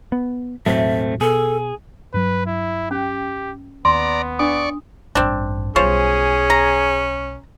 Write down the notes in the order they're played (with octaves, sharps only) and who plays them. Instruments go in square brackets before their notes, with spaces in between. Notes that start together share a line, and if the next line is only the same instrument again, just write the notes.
[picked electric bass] B3
[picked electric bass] E1 A2 F#3 [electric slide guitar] A3 C4 [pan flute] E5
[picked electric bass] B2 [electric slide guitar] G#4 [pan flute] A4
[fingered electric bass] G2 F#3 [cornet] B4
[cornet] E4
[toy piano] C#4 [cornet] G4
[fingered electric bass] D#2 [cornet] B3 [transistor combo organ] D5 A#5 [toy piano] C6
[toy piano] D4 D#6 [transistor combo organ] D5 C#6
[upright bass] A1 G2 [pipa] C4 D4
[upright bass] B1 G3 [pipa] F3 C5 C#5 [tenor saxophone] C#4 [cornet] G#4
[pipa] A#5